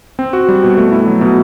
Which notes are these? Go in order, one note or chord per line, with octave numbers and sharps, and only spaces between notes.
C4
F#4
G3
B2
A3
E4
F#3
B2